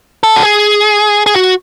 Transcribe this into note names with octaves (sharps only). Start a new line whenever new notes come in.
A4
F#4
G#4
G#4
F#4